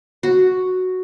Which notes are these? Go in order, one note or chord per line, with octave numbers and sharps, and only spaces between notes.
F#4